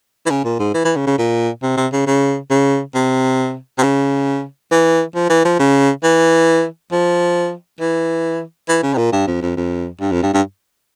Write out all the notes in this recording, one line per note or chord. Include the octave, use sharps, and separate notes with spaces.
E3
C#3
A#2
G#2
E3
E3
C#3
C#3
A#2
C3
C3
C#3
C#3
C#3
C3
C3
C#3
E3
F3
E3
F3
C#3
E3
F3
E3
E3
C#3
C3
A#2
G2
F2
F2
F2
G2
F2
G2
G2